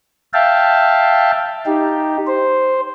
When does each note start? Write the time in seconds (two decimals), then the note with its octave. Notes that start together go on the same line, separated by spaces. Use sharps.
0.33 E5 F5 G5 A5
1.66 D#4 G4
2.27 C5